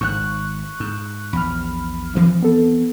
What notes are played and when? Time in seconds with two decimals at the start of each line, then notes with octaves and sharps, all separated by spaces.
0.01 G#1 G#2 C#6 F#6
0.80 G#2
1.33 A#1 E2 B5 F6
2.15 D2 E3 F3 C4
2.42 B3 A4